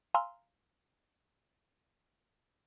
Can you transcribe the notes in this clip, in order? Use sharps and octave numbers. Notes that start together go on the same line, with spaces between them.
F5 G#5 A#5 C6 E6 F6